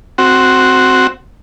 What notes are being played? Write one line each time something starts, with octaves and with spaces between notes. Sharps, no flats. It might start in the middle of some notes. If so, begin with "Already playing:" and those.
C4 F#4